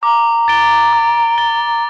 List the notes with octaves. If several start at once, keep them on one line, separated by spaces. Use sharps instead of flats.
A#5 D6
A6 D7 G7
D6
A6 D7 G7